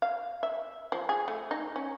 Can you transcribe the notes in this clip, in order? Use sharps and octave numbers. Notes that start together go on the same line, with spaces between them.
F5
E5
F3
G#4
A3
D#4
C#4